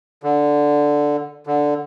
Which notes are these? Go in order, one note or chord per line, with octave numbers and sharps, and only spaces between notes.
D3
D3